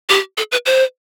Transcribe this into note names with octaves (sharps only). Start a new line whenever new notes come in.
G4
A4
B4
C5